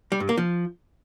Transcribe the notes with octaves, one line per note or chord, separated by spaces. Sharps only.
G3
G2
A#3
F3